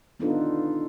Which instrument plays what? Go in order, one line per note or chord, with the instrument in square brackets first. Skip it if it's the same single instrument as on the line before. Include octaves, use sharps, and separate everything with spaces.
[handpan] B3 D4 D#4 F4 A4 B4